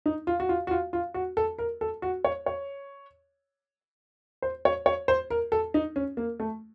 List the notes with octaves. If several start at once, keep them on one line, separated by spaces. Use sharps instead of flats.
D#4
F4
F#4
F4
F#4
F4
F4
F#4
A4
A#4
A4
F#4
C#5
C#5
C5
C#5
C#5
C5
A#4
A4
D#4
C#4
A#3
A3